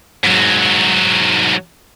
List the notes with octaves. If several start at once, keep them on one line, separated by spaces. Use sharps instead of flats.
G#2 F#3